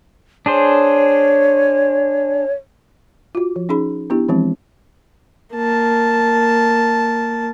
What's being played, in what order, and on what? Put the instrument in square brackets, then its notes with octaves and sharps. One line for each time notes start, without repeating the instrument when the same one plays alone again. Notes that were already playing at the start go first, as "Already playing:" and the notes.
[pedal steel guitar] D4 G#4 C5 [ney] C#5
[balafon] F4 F#4
F3
C#4 D#4 G#4 B5
B3 D4 E4 G4
E3 F3 G#3 C4
[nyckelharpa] A#3 A5